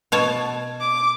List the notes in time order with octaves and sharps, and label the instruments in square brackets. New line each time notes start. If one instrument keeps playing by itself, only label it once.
[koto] B2 C#5 A5
[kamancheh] D6